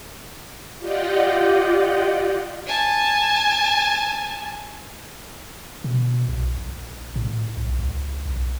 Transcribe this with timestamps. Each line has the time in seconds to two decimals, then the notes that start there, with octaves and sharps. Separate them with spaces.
0.78 F4 G4 D5 D#5 F#5 G5
2.66 G#5 A5
5.84 B2
6.28 B1
6.58 A#1
7.16 A2
7.57 B1
7.79 C#2
8.26 B1